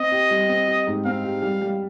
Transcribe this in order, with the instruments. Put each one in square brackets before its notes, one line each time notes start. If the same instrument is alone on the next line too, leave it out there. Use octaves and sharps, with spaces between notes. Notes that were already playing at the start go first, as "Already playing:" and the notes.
Already playing: [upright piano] C4 [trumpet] D#5
[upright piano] G4
G3
C4
G4
G#2
[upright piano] C4 [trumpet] F5
[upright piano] G4
G3
G3